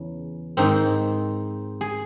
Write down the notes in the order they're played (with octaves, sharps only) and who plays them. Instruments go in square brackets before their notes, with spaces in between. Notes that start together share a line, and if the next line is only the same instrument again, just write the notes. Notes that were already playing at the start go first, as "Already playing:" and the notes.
Already playing: [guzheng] E2 C#3
G#2 D#3 C4 D#4
G#4